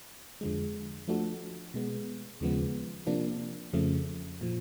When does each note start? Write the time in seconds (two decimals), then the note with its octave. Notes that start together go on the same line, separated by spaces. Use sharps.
0.41 F2 D3 F3 G#3
1.08 F3 A3 D4 F#4 A4
1.74 B2 G#3 B3
2.40 D#2 C#3 F3 G#3 B3
3.07 C3 F3 A#3 D4
3.73 F2 C#3 F3 A3
4.41 A#2 F3